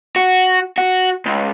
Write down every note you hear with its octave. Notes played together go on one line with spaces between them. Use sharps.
F#4
F#4
C#2